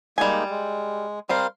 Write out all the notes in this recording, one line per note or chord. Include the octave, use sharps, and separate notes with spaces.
G3 G#3 A#3 D#4 G#5
G#3
G3 C4 A#4 C5 F5 C6